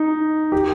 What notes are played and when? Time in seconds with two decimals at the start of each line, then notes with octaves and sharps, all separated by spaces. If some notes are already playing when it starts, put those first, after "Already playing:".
Already playing: D#4
0.52 G4